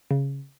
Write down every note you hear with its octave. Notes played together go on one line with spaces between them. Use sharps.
C#3